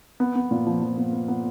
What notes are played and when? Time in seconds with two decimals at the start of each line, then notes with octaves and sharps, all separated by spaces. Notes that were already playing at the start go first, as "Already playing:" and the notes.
0.20 B3
0.36 B3
0.51 A#2
0.67 F3
0.82 F3
0.97 B3
1.13 B3
1.28 B3